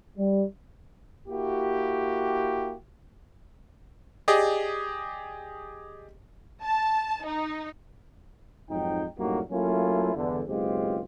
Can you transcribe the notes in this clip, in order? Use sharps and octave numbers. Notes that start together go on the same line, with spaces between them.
G3
A#3 E4 F#4 G4
G4 G#4 D5 D#5
A5
D#4
F2 G#2 F#3 D#4 G5
F#2 A2 G3 A#3 D#4 F#4
F#3 A3 A#3 C#4 E4 F4
E2 G2 D3
F#1 B1 G#3 C4 F4 G4